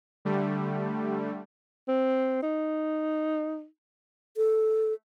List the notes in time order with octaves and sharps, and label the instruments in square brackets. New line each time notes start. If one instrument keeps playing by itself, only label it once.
[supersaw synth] D3 G3 A3
[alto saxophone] C4
D#4
[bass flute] A4